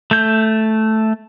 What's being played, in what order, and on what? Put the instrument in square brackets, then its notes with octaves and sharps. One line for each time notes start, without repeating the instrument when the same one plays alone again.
[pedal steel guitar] A3 G6